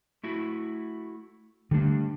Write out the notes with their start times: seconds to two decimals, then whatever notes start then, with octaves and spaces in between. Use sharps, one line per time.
0.23 A3 E4 F#4
1.71 D3 G3 A3 D4